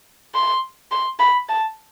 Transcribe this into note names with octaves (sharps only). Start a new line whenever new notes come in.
C6
C6
B5
A5